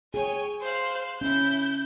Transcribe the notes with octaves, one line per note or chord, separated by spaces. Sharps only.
G#4 C#5 G5 G#5
C5 F5 F#6
C#4 E4 G6